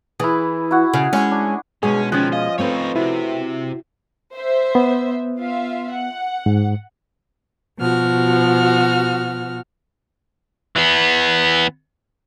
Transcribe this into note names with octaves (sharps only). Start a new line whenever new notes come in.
E3 E4 G#4
E4 F#4
C#3 G#5
G#3 C#4
D4
G2 B2 G#3 C#4 F#4 G#4
D#3 F3 C#4 F#6
D#5 F5
A3 C4 D#4 B4 C#5
C3 E4 F#4
C5 E5
B3
F4 E5 F5
F#5
G#2
B2 F3 F#4 F6
E3 B3